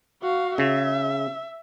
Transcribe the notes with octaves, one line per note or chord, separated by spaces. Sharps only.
F#4 F5
C#3 E5